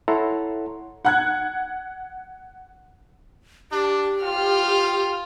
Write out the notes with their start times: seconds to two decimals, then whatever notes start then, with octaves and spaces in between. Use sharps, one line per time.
0.08 E4 A4 C#5 F#5 A#5 C6
1.05 F#5 F#6 G#6
3.72 D4 G4
4.23 F4 G5 F6